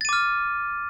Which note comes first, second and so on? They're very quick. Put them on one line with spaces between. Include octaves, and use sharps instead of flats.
A6 D#7 D6 F6